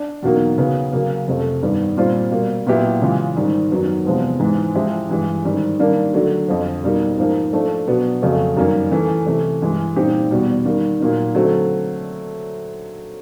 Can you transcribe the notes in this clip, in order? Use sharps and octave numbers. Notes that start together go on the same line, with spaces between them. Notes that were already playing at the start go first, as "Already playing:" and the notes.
Already playing: D4
E2 B2 F#3 A#3 D#4
C#3 F#3 B3
C#3 F#3 A#3
F2 C3 F3 A3
G2 D#3 G3 B3
A#2 G3 C4 F4
B2 G3 A#3
A#2 F#3 B3 E4 G4
C#3 E3 G#3 C#4 F4
G#2 D#3 G3
F#2 D#3 F#3 B3
E2 C3 F3 G#3 B3
G#2 E3 G#3
F3 G#3 C#4 E4 G4
G2 E3 G#3
G#2 D#3 G3
D#3 G3 A#3 D4
D3 F#3 A3 D4
F2 D3 F3
B2 G3 A#3 D#4 G4
G#2 F3 A#3 D#4
F3 A3 D4
B2 F#3 B3 D4
F2 C#3 F#3 A3
F#2 D#3 G3 A#3 C#4
E3 A3 C#4
C3 E3 A3
G2 E3 G#3
A#2 G3 C4 D#4 G4
E2 B2 G3
D#3 G3 A#3
A#2 F#3 A#3 D#4
D3 F#3 A3 C4